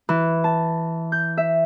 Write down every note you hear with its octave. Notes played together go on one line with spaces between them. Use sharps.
E3
A5
G6
E5